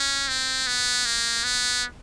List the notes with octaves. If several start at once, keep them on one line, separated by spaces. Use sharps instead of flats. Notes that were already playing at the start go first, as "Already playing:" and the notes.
Already playing: C#4
C4
B3
A#3
B3